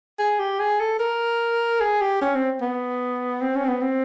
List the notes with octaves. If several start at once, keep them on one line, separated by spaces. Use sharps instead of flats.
G#4
G4
G#4
A4
A#4
G#4
G4
C#4
C4
B3
C4
C#4
C4
B3
C4